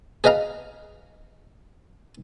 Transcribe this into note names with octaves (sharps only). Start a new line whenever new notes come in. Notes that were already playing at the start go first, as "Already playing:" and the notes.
G#4 B4 D#5 F5 A#5